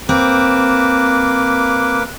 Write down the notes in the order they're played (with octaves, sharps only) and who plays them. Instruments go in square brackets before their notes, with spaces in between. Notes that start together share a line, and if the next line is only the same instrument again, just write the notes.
[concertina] A#3 B4 D6 [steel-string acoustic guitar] C4